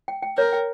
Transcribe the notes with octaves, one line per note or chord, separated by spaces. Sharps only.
G5
G5
A#4 C#5
G5